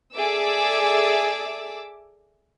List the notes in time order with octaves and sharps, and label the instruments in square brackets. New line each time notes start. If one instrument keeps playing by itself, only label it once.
[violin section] G#4 A4 D5 E5 D6 E6